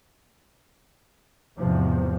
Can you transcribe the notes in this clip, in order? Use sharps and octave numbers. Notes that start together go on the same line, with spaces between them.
E2 G#2 C3 F3